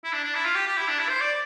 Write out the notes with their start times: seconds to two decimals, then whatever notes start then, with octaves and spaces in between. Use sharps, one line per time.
0.04 E4
0.12 D4
0.24 D4
0.35 E4
0.45 F4
0.55 G4
0.67 G4
0.77 E4
0.88 D4
0.99 E4
1.09 C5
1.21 D5